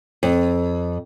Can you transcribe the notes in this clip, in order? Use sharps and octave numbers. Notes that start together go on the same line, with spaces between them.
F2